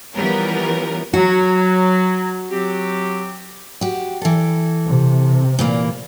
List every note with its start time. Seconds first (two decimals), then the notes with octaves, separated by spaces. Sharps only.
0.14 E3 F3 G3 B3 C#4 A#4
1.13 F#3 F#4
2.51 F#3 C4 G4
3.81 F#4 G4
4.22 E3 A4
4.86 C3
5.59 A#2 E3 A#3